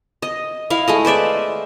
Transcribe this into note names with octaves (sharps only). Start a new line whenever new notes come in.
D#5
E4 F5
G#3 A3 D#5
B4 C5 D5 E5